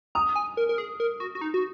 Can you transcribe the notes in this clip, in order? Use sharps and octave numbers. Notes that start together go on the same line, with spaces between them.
A#5 D#6
G#5
A#4
A#4
G#4
A#4
F#4
F#4
D#4
F#4